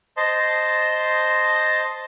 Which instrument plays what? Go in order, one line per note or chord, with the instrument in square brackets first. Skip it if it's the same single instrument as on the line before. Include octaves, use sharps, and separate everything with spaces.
[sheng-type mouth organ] C5 D#5 A5 C6